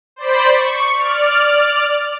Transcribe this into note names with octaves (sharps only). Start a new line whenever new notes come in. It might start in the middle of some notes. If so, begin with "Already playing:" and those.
C5 D5 B5
C#6
D5 F6